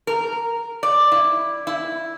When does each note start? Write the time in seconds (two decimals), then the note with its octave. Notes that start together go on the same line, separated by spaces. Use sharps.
0.07 A#4
0.83 D5
1.12 E4
1.67 E4